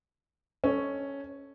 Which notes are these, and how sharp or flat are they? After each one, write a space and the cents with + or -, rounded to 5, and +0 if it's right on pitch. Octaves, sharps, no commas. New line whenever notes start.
C#4 +0 A4 +0 D#5 -5